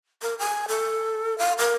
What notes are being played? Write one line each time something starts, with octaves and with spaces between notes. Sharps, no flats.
A#4
G#5
A4
F5
A#4